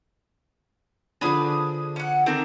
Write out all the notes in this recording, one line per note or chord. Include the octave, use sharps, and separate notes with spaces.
D3 F3 D4 G#4 B4 D#6
C#4 F#5
D#3 C4 D4 A4 A#4